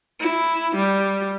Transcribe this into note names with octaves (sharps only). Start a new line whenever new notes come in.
E4
G3